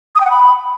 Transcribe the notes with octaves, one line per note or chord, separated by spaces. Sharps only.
D#6
G5
F#5
B5